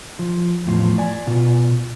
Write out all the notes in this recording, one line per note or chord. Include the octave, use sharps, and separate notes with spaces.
F3
E2 A2 F3
D5 G#5
B2 F4